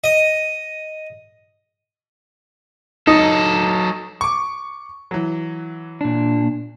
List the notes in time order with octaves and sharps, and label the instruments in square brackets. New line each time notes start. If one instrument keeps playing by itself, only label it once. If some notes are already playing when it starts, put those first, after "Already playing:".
[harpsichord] D#5
[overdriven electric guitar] F#3 A4 [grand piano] D#4
[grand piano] C#6 D6
E3 F#3
[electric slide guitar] A#2 D4